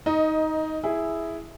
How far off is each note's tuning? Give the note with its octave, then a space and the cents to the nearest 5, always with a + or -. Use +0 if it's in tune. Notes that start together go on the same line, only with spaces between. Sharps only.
D#4 +15 D#5 +0
E4 +0 G#4 +0